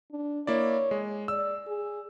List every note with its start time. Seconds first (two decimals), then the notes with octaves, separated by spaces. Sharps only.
0.12 D4
0.47 A#3 E4 C#5 D5
0.91 G#3
1.28 D5 E6
1.67 G#4